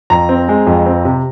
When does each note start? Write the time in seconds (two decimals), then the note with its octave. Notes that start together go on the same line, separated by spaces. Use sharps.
0.10 F2 A#5
0.29 C4
0.49 G#3
0.67 F2
0.86 C4
1.05 C3